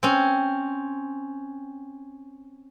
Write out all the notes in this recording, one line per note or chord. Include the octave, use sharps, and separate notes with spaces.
C4 C#4